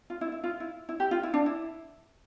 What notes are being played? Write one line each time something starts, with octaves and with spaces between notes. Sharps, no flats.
F4
E4
E4
F4
E4
E4
G4
F4
E4
D4
E4